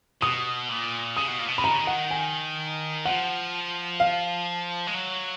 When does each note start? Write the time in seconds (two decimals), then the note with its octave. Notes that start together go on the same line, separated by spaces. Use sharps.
0.22 B2 D#6
0.69 A#2
1.17 C#3 D#6
1.28 B2
1.38 A#2
1.48 B2
1.58 B5
1.64 D#3 A#5
1.72 C#3
1.80 D#3
1.87 F#5
2.11 G#5
3.05 F3 F#5
4.00 F5
4.87 G#3
4.94 F#3